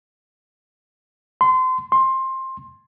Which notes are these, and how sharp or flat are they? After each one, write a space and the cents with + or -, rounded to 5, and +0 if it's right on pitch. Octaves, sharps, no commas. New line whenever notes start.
C6 -30
C6 +15